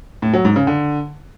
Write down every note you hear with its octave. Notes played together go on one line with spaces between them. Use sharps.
A2
F#3
G#2
C#3
D3